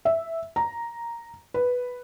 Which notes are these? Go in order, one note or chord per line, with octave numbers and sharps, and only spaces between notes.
E5
A#5
B4